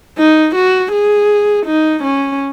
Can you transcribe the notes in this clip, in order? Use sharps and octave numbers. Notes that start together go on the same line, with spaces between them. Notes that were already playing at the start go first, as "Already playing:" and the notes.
D#4
F#4
G#4
D#4
C#4